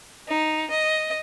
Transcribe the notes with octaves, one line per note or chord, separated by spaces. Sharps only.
D#4
D#5